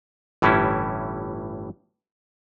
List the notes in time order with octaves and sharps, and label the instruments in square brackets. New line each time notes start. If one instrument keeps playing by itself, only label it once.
[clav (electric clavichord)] G1 A2 E3 G3 C#4 E4